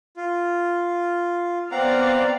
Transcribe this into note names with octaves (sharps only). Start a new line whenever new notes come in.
F4
B3 C4 D5 F5 F#5 A#5